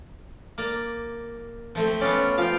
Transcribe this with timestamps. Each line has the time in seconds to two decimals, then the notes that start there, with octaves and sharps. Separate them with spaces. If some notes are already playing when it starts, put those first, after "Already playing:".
0.58 A#3 D5
1.75 F3 A3 C4
2.01 B3 C#4 F4 D5
2.38 F3 F5 G5